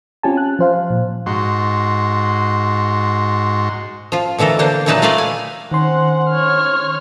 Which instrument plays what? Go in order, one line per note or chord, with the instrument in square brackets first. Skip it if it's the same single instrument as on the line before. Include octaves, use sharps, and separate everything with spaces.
[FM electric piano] C4 C#4 F4 G4 G#5 A5
F#6
F3 C5 F5
A#2
[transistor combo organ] G#2 F#4 C6
[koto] F3 F4
B2 D3 E3 A4 A#4
D3 A#3 D4 C5
A#2 E3 F#3 D#4 B4 A5
A3 F4 A#4 B4 D5 F5
G#5
[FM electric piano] D#3 C6 [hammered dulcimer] C4 C#4 A#4 [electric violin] F#5
[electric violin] C#5 F6